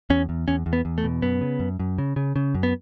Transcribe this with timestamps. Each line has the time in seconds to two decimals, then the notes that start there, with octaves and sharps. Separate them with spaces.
0.10 E2 C#4
0.29 E2
0.48 E2 C#4
0.66 E2
0.73 B3
0.85 E2
0.98 A3
1.04 B2
1.22 F#2 B3
1.41 C#3
1.60 F#2
1.79 F#2
1.98 C#3
2.16 C#3
2.36 C#3
2.55 F#2
2.63 B3